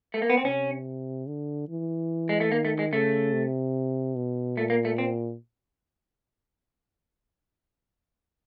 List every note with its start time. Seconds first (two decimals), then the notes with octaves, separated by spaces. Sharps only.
0.14 A3
0.22 A#3
0.30 B3
0.37 C4
0.45 C3 C#4
1.27 D3
1.69 E3
2.29 G#3
2.40 A3
2.51 D#3 A#3
2.65 A3
2.79 G#3
2.93 C#3 A3
3.33 C3
4.16 B2
4.57 A#2 A3
4.70 A#3
4.85 A3
4.98 C4